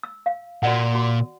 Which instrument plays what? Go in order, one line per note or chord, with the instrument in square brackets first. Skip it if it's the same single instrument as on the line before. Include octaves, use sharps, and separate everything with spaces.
[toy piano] E6
F5
[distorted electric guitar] A#2 [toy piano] F#4 D5 F#5
[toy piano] F#4